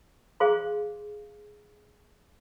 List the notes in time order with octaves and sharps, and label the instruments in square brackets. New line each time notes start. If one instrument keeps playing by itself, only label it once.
[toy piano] G#4 C5 F5 C6